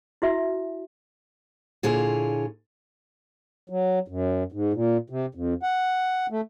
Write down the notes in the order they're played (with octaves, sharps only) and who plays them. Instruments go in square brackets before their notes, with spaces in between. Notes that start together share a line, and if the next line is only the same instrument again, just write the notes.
[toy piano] E4 F#4 E5
[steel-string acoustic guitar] A#2 D3 E4 F4 G#4 C#5
[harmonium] F#3
F#2
G#2
A#2
C3
F2
F#5
A3